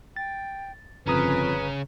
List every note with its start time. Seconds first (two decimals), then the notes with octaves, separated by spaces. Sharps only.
0.16 G5 A6
1.06 G1 F2 C#3 C#4 B4 A#5 D#6